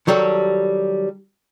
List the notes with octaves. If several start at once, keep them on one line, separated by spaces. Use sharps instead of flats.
D#3 F#3 G3 G4 A4